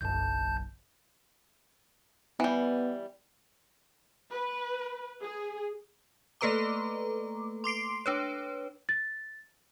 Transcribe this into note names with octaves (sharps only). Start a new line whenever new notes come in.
F#1 B1 A5 G6
E3 G3 B3
B4
G#4
A3 A#3 A4 B4 A#5 D6
C6 D6 C7 D7
D4 B4 C#5
A6